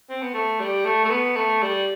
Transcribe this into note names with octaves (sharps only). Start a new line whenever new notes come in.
C4
B3
A3
G3
A3
A3
B3
A3
G3